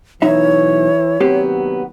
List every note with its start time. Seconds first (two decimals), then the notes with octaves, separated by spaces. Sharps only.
0.22 B1 E3 D#4 E4 C#5 E5
1.21 D#2 C3 F#3 B3 C4 G4